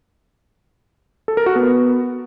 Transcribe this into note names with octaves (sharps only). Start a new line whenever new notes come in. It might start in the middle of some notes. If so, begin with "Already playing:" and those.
A4
A#4
F#4
B3